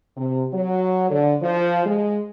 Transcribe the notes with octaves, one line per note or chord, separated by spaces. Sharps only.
C3
F#3
D3
F3
G#3